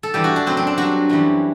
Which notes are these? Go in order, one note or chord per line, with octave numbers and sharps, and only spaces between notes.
A4
G2 E3 G3 G4
F#4
D4
F#2 F#3 C4
C4
D4
G2 F#3 F#4
F#2 E3 G3